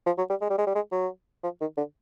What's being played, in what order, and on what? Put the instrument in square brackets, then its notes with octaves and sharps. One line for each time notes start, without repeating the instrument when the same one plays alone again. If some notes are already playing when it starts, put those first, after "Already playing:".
[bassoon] F3
F#3
G3
G#3
G3
G#3
G3
G#3
F#3
F3
D#3
D3